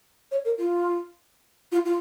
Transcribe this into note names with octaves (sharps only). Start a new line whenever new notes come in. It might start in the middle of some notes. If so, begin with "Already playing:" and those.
C#5
A#4
F4
F4
F4